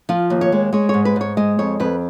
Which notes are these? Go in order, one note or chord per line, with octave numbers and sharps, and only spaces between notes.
F3 F4
D#2
C#5
G#3
G#3 C#5
G#2 C#5
B4
G#2 C#5
G#3 D#5
F2 C#5
F2 B4